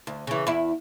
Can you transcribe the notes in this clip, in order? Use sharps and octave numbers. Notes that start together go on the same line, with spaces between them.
D2
C#3 E3
E2 E4